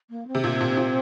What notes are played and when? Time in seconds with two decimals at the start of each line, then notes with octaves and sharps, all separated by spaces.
0.10 A#3
0.27 C4
0.35 C3
0.44 A#2
0.61 A#2
0.77 A#2